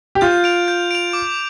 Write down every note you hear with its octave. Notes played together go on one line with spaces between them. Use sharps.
G4
F4 G6
D7 F7
G6
D7 F7
D6